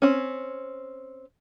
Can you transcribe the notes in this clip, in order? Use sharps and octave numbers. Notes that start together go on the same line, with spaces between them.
C4 C#4